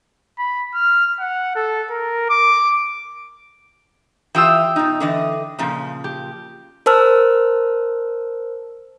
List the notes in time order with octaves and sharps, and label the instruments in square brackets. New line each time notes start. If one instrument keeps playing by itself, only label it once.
[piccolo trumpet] B5
F6
F#5
A4
A#4
D6
[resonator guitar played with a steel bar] E3 F4 G4 [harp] G5 D#6 E6
[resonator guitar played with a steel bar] B2 D#4
D3 E3 D#5
A#2 C#3 F3
[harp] G4
[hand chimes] A#4 C5 A5 E6 F6